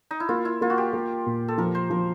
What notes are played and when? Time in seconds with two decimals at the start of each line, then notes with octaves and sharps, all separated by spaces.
0.11 D#4
0.20 E4
0.29 A#3 F4
0.45 E4
0.61 A#3 F4
0.70 F#4
0.78 G4
0.93 A#3
1.26 A#2
1.48 A4
1.58 F3 A#4
1.75 C5
1.90 F3 A#4